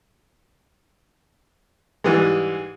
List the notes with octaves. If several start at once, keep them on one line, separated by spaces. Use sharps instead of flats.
G#2 E3 G3 G#3